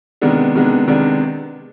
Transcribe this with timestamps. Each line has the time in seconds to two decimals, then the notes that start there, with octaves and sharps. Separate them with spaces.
0.21 C3 D#3 G#3 B3 D4
0.55 C3 D#3 G#3 B3 D4
0.88 C3 D#3 G#3 B3 D4